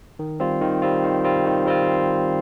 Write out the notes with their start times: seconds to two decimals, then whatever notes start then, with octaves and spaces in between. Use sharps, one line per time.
0.19 D#3
0.40 G3 C4 F4
0.61 D#3
0.82 G3 C4 F4
1.04 D#3
1.24 G3 C4 F4
1.46 D#3
1.66 G3 C4 F4